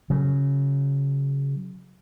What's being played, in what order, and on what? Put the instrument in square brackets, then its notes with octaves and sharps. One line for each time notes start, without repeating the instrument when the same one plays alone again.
[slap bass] C#3 F#3